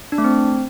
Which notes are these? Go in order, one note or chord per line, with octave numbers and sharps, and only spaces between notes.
D4
A3
C4